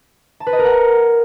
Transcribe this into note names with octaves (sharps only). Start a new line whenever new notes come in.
A5
B4
D#5
A#4
F#5